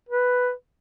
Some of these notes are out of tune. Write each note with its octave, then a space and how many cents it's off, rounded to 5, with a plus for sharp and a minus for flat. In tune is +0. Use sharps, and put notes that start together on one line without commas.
B4 +5